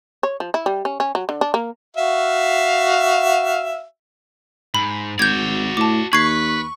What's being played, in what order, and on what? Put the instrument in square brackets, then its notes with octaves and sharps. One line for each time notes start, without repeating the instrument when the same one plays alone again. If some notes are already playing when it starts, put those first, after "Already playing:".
[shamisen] C#5
F3
E4
G3
C#4
C#4
F#3
D3
D4
A#3
[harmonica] F#4 E5 F5
[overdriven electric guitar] G#2 [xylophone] B5
[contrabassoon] G#1 [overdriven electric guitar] F#4 D5 [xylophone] G6 G#6
[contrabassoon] A2 [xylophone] A5 D6
[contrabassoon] D#2 [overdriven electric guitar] B4 [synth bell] C#6 [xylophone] G#6 C7